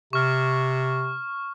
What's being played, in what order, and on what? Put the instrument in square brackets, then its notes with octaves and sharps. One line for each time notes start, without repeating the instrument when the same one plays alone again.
[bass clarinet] C3 [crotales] C#6 F6